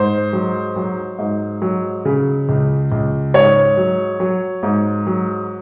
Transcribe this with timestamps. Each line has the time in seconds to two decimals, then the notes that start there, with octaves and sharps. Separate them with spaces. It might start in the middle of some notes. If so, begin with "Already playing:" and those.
Already playing: G#2 C5
0.33 F#3
0.76 F#3
1.19 G#2
1.62 F#3
2.05 C#3
2.49 C#2
2.92 C#2
3.34 G#2 C#5
3.77 F#3
4.20 F#3
4.63 G#2
5.07 F#3